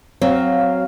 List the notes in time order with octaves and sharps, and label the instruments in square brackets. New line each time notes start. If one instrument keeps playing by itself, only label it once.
[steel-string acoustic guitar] F#3 [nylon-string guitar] C4 [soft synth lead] F5